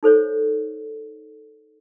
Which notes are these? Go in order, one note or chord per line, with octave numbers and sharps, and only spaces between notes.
D#4 A4 C5 C#5